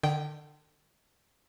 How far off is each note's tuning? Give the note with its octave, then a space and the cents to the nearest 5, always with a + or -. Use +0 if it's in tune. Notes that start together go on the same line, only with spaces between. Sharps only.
D3 +25 G5 -20